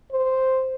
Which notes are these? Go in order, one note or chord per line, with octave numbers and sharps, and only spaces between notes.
C5